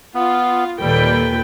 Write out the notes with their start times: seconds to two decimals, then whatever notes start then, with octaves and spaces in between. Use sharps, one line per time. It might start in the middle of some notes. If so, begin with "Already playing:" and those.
0.15 B3 F4
0.81 D#2 A#2 G3 A4 B4 G5